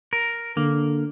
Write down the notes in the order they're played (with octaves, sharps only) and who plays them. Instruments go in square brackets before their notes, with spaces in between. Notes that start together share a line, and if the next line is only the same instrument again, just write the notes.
[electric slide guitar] A#4
[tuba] D3 [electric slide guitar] A#3